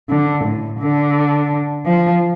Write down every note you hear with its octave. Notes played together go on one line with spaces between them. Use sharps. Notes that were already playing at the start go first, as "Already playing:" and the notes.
D3
A2
D3
F3